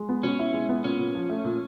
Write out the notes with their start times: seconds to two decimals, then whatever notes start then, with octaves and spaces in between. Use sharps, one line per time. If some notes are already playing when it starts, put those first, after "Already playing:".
Already playing: G#3
0.09 B3
0.23 B2 C#4
0.39 E4
0.53 G#3
0.69 B3
0.84 A#2 C#4
0.99 A#2
1.15 F3
1.29 A3
1.44 A#2